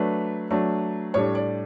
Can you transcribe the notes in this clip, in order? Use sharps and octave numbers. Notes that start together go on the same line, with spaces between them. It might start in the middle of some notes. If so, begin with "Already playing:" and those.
Already playing: F#3 A3 D4 B4
F#3 A3 D4
A2 G3 D4 C#5
D5